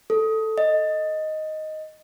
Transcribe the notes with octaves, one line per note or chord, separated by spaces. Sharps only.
A4
D#5